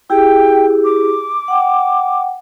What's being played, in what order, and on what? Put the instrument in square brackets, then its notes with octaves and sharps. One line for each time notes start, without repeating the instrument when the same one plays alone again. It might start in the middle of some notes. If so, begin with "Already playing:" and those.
[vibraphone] E4 G4 G#4 [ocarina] G5
[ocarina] D6
[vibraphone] F#5 G5